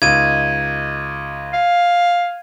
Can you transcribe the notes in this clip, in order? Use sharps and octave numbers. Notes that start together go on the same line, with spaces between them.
C#2 D#4 G#6 D#7
F5